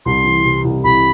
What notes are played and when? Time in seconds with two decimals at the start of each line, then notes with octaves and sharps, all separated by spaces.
0.05 C2 C6
0.24 E3
0.44 C3
0.64 C2
0.84 C2 B5